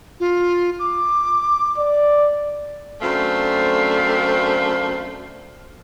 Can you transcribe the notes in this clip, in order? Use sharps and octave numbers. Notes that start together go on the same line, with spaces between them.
F4
D6
D5
F#2 A3 C4 D4 C5 F5